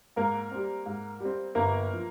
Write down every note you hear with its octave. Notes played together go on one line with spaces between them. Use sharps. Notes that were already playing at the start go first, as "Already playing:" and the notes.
G#2 A#3 A#4
G3 C4
G#2
G3 C4
G1 A#3 A#4
F3